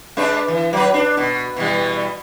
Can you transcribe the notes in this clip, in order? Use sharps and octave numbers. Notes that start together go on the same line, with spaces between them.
G#3 D4 B4
E3
F#3 B4
D4
B2
B2 E3 G3